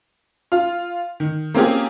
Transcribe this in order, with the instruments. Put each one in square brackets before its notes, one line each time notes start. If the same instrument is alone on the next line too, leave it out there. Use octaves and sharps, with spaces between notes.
[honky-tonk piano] F4
D#3
A#3 C4 C#4 F4 G4 G#4